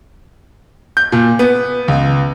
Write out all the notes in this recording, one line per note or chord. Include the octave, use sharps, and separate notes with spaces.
G6
A#2
B3
C#2